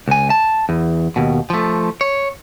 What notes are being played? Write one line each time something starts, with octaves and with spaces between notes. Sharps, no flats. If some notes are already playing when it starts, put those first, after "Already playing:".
C#2 G#5
A5
E2
D#2 B2
F3 A3
C#5